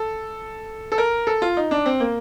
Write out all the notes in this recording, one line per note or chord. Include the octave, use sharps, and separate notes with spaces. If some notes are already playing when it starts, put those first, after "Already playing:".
Already playing: A4
A4
A#4
A4
F4
D#4
D4
C4
A#3